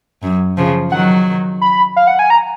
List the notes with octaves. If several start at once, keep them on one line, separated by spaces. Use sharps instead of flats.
F#2
C#3 F3
D#3 F#3 F#5
B5
F5
F#5
G#5
A#5